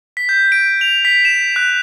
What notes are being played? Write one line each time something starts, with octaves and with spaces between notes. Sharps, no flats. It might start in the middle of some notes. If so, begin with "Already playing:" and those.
B6
G6
D7
F7
B6
E7
F#6